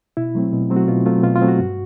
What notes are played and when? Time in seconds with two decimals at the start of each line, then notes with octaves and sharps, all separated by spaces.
0.17 B2 E4
0.35 F#3 A3 C4
0.52 B2
0.70 F#3 A3 C4
0.76 F#4
0.88 B2 F4
1.06 F#3 A3 C4 F4
1.23 B2 F4
1.36 F4
1.42 F#3 A3 C4
1.48 F#4
1.60 G2